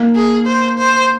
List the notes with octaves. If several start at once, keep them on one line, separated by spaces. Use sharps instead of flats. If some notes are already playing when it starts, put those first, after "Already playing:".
Already playing: A#3
G#4
C5
C5